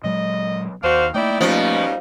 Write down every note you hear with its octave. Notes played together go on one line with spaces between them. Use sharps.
A#2 F#3 G#3 D#5
D#2 D4 F#4 C5 F5
A3 A#3 D#4 E4 D5 G5
B2 F3 G3 C#4 D#4